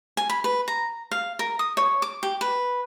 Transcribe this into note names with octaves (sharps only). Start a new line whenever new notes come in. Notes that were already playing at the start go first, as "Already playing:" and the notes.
G#5
B5
B4
A#5
F5
A#4
D#6
C#5
D6
G4
B4